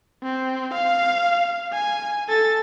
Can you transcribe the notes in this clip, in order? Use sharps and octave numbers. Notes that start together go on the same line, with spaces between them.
C4
F5
G#5
A4 A6